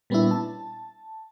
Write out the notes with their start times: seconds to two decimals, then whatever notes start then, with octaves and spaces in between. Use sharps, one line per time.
0.10 A#2 G3 B3 C#4 D4 E4
0.31 A5